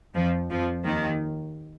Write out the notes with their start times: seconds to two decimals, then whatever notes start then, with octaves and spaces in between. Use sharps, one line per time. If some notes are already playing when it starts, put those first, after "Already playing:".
0.15 F2 F3
0.50 F2 F3
0.85 D#2 D#3